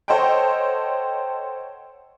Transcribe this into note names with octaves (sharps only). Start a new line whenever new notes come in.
A4 C5 C#5 D#5 F#5 G5